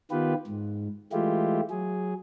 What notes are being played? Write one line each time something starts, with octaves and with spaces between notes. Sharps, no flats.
D#3 B3 F4 G4 B4
G#2
E3 G#3 A3 E4 F4 G4
F#3 G#4